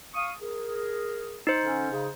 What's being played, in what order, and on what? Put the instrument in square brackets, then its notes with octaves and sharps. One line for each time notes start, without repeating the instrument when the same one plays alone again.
[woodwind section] F5 C#6 D#6
G#4 A#4
[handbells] D#4 C5
[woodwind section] D3 C#4
C#3